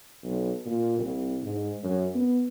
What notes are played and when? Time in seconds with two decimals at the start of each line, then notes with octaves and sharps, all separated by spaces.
0.24 B1
0.66 A#2
0.99 C2
1.43 G#2
1.83 F#2
2.14 B3